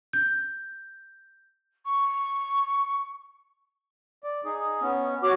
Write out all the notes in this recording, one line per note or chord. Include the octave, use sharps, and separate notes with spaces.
G6
C#6
D5
D#4 G#4
B3 C#4
F#4 C#5 D6